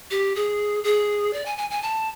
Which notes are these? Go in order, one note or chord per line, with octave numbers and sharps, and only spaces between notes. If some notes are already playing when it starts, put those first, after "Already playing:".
G4
G#4
G#4
D5
G#5
G#5
G#5
A5